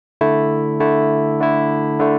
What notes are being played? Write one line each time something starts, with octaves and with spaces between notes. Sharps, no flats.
D3 A3 E4
D3 A3 E4
D3 A3 E4
D3 A3